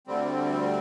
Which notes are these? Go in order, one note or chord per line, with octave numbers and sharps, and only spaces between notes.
D2 D3 G3 C4